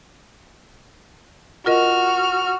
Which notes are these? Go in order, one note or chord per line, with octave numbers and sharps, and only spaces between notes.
F4 F#4 A#4 D#5 F6